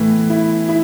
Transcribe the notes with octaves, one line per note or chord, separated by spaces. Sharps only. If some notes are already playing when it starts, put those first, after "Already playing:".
Already playing: A2 E3 B3
E4
E4